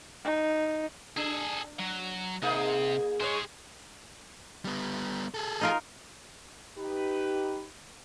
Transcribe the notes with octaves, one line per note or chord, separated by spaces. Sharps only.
D#4
D4 G#4 A4
F#3
C3 A#3 D#4 G#4
G#3 G#4 A#4 C5 C#5
G3 B3
G#4 A4
D#4 F4 A#4
D#4 G4 B4